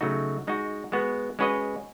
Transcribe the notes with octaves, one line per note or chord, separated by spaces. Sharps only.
C#3 F#3 A3 D#4 F#4
G#3 D#4 F#4
G#3 B3 F#4
G#3 C#4 F#4 B4 D#5